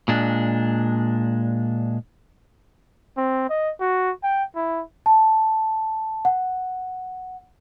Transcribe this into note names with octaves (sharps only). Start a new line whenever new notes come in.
A#2 G#3 D4
C4
D#5
F#4
G5
E4
A5
F#5